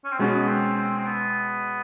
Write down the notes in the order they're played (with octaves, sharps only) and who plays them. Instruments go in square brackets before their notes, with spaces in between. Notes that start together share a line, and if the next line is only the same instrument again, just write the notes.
[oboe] C#4
C4
[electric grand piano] B2 G#3 C#4 F#4 [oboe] B3
[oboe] C4
C4
C4
B3